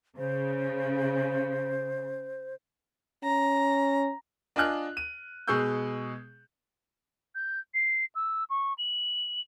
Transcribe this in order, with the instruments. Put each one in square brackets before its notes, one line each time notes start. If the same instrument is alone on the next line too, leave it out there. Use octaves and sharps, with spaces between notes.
[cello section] C#3 [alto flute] C5
[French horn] C#4 [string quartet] A#5
[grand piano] D4 F4 D#5 G#5 F6 F#6
D#7
B2 G#3 G#4 C#6 E6 G6
[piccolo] G6
C7
E6
C#6
F#7